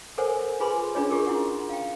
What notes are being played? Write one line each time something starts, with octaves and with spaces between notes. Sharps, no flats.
A4 A#4 C5 C#5 F#5 G#5
F4 G#4 B4 G#5 B5 C6
C#4 D4 F4 G#4 C#5 D#5
F4 G4 G#4 A#4
E4 F#4 F#5
F5 G5